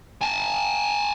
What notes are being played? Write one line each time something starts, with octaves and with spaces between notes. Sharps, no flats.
G#5 A5